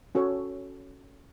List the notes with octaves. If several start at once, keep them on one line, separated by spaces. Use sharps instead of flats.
C#4 F#4 A4 C#5